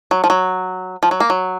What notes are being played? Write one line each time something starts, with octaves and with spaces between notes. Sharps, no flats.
F#3
F3
F#3
F3
F#3
A#3
F#3